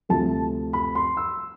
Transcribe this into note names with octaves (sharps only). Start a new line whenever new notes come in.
D2 C3 F3 A3 A5
B5
C6
E6